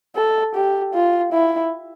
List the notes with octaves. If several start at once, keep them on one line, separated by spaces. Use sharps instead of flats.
A4
G4
F4
E4